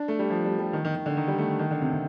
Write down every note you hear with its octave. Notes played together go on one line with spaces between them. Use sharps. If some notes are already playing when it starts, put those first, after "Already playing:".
Already playing: D4
A3
G3
F3
G3
G3
D#3
D#3
D#3
D3
D#3
G3
A3
D#3
D3
C3
C3